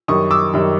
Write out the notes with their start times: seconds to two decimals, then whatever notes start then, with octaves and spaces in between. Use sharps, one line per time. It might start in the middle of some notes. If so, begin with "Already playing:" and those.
0.08 F#2 D#3 G3 C#6 D#6
0.31 D6 E6
0.53 F#2 D#3 G3